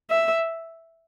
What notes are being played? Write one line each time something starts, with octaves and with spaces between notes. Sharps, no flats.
E5